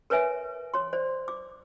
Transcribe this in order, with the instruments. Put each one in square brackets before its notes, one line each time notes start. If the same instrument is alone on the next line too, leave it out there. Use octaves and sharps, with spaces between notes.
[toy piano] A#4 B4 C#5 E5 G#5
C#5 C6
C5 D5
D6